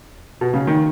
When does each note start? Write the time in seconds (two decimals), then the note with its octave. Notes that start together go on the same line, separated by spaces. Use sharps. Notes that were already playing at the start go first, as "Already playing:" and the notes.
0.41 B2
0.54 C#3
0.67 D#3